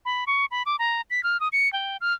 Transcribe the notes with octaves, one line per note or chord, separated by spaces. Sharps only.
B5
C#6
B5
D6
A#5
B6
F6
D#6
C#7
G5
F6